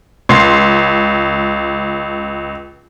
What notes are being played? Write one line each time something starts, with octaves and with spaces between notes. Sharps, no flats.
C#2 C6 C7